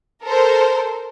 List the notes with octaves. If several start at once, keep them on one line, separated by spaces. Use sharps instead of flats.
A4 A#4 C5